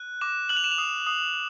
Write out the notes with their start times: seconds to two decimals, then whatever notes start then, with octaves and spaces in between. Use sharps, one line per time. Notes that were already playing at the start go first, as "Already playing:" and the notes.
Already playing: F#6
0.21 D6 E7
0.49 F#6 F#7
0.57 F7
0.64 E7
0.71 F7
0.78 D#6
1.07 D#6